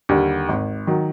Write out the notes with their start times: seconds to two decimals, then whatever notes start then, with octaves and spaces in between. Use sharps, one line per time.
0.09 D#2 D3 G3
0.49 G#1
0.87 D#3 F#3